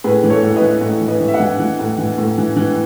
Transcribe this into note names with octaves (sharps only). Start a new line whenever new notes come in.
A2 G#4 B4
E3
A4 C#5
A2
B4 D#5
E3
A2
E3
B4 D#5
E3
E5
D#5 F#5
E3
E3
A2
E3
A2
E3
E3